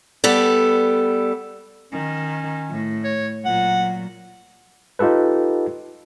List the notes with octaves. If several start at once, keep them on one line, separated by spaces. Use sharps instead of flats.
G3 B3 A4 D5
D#3 C#4
A2
C#5
A#2 F#3 F#5
D#4 F4 G4 A4 B4